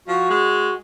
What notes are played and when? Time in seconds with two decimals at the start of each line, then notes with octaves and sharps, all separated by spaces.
0.08 F3 F#4
0.30 G#3